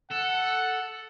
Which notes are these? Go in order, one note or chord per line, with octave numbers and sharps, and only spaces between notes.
A4 F#5